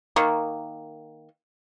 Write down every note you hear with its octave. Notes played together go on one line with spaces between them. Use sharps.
D#3 A#3